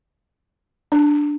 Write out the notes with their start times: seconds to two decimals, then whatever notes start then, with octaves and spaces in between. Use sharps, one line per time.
0.92 D4